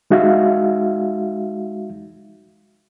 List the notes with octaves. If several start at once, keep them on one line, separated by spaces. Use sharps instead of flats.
G#3 D#4 F#4 E5 F5